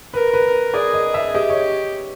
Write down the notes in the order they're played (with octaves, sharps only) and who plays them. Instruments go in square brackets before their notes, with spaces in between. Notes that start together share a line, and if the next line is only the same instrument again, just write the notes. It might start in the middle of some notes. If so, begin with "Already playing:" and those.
[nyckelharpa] A#4 [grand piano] B4
[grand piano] B4
[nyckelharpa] G#4 [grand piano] D5
[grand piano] D#5
E5
[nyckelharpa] G4 [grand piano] D#5
[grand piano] C#5